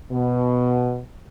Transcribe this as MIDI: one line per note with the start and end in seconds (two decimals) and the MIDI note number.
0.11 1.00 47